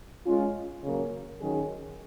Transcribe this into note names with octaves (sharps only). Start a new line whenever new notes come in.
G#3 C#4 F4
C#3 F#3 A#3
D#3 F#3 C#4 G#4